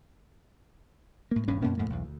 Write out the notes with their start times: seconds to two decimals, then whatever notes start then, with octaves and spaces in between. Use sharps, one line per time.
1.31 A2 A#3
1.48 D#1 G2 G3 C#4
1.62 F#2 B2 A#3 C#4
1.78 F2 A2 A3 A#3
1.90 B1 E2
2.04 D2